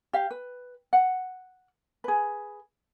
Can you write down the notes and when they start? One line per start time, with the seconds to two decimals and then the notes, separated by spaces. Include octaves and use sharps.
0.13 G4 F5
0.31 B4
0.93 F#5
2.04 G#4 B4